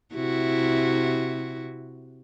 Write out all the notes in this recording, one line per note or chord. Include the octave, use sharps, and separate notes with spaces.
C3 E4 F#4